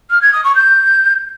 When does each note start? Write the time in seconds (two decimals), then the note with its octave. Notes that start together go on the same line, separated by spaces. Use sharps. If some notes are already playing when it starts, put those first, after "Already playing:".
0.10 F6
0.21 G#6
0.32 D#6
0.44 C#6
0.55 G6